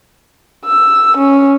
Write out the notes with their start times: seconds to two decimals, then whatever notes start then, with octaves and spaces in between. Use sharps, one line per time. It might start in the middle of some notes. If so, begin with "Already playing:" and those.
0.65 E6
1.17 C#4